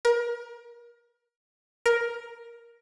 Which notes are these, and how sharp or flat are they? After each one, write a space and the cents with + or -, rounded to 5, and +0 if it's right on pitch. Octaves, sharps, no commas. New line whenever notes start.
A#4 +30
A#4 +10